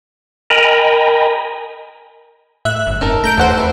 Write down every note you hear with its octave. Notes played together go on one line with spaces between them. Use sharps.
A#4 D#5 G5 G#5 A#5 B5
A2 E5 F#6
G1
F1 D#4 A4 A#4
A3 A#5 G6 D7
E2 A4 C5 F#5
E3 E4